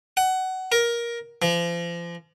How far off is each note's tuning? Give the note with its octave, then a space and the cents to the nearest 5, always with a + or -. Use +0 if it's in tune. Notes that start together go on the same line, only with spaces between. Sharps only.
F#5 +20
A#4 +15
F3 -35